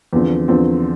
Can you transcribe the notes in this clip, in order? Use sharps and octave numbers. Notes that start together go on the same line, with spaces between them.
E2 D3 F3 C4
E2 D3 F3 C4